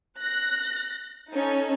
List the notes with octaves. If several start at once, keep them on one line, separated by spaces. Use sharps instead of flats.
F#6 A#6
C#4 D#4 A4